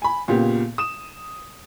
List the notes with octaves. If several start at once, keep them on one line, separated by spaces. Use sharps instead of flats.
G#5 B5
A#2 C#3 B3 G4
D#6 E7